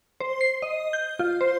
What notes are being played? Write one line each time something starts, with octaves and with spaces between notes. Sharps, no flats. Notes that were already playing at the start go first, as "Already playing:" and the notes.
C5
C7
D#5
G6
F4
C5